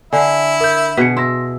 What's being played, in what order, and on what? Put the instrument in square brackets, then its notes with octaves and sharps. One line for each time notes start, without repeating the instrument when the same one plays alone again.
[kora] D3 [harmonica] E4 [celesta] D5 G#5
[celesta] A#4 G6
[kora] B2 G#4 [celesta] B6 C#7
[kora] E4 [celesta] C6 A#6